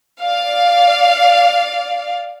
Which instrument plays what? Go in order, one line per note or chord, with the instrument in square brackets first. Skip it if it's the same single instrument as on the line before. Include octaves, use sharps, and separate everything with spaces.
[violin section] D5 F5